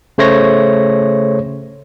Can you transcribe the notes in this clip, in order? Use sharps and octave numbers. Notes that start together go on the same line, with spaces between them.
C#3 A3 C5 C#5 A#6